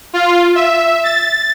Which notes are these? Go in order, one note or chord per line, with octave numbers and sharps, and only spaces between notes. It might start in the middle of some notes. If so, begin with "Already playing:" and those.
F4
E5
A6